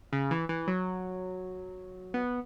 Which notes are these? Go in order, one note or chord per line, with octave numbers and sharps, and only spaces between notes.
C#3
E3
E3
F#3
B3